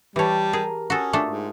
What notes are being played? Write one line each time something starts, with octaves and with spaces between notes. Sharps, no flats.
E3 G3 G4 C#5 A5
G#4 A#4
C#4 F#4 A4 C#6 D#6
A3 D4 F4 A4
G#2